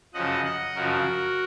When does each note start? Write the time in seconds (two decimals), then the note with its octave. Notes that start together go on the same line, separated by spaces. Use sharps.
0.14 F#2 C#3 F3 D#5 F#5
0.44 D#5 F#5
0.75 F#2 C#3 F3 F#4 A#4